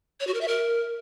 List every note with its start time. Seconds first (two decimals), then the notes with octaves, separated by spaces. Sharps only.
0.20 C#5
0.27 F#4
0.34 A#4
0.41 E5
0.48 A#4